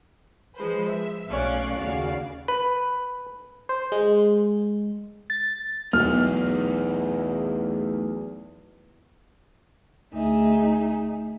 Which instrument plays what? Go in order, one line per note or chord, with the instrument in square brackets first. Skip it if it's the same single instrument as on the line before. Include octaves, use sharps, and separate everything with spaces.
[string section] F3 G#3 B4 C5
E5
B1 A3 C#4 D5 F5 F#6
D#2 C#3 F#4 D5 F5
[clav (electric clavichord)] B4
[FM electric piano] C5
G#3
[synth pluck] A6
[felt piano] B1 [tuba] E2 [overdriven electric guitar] A3 D#4 [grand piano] F6
[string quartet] D2 D#4 G#4 E5